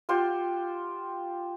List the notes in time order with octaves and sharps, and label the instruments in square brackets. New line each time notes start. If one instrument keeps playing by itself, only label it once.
[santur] F4 G4 C5 F#5